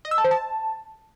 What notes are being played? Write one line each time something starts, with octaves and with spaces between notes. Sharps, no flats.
D#5
E6
A5
C5
A5